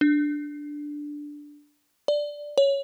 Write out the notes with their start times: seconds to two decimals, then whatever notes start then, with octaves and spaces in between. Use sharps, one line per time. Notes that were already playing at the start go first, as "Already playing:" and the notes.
0.01 D4
2.08 D5
2.58 C#5